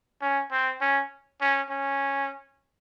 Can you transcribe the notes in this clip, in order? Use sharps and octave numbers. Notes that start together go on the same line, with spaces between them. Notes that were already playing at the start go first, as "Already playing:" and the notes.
C#4
C4
C#4
C#4
C#4